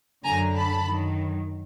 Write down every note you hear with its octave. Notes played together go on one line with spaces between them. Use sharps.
F#2 D3 F#3 G#5 A#5
A5 B5
F#2 D#3 F#3